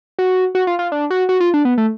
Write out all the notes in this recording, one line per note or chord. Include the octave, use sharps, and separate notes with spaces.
F#4
F#4
F4
F4
D4
F#4
F#4
F4
D4
B3
A3